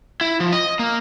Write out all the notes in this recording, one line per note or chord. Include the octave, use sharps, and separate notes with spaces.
E4
F3
D#5
A#3